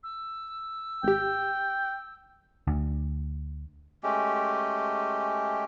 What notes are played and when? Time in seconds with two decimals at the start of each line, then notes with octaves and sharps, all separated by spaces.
0.03 E6
1.03 G#1 G4 G5
2.67 D2
4.03 G#3 A3 C#4 G4